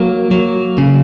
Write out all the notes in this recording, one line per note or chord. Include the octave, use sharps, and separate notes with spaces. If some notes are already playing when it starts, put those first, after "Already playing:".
Already playing: F#3 A#3
F#3
C#3